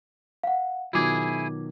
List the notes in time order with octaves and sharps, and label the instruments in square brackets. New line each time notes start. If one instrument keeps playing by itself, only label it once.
[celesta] F5 F#5
[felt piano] B2 D#3 F#3 [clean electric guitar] E4 G#4 [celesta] F4 D6 G#6